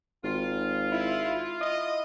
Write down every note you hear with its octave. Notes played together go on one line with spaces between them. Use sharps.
G#1 F4
E4
E4 D#5